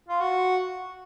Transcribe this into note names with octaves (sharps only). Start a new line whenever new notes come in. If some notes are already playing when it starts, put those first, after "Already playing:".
F4
F#4